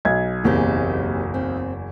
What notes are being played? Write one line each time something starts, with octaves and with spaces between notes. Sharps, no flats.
B1 G#6
F#1 E2 A#3 C4 G4
C4